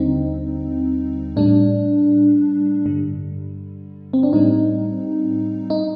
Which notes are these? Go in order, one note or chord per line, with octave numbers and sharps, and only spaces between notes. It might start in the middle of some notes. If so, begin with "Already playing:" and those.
Already playing: D#2 D3 G3 C4 D#4
A2 G3 D4
G2 D3 G3
C4
D4
A2 G3 C4 D#4
D#4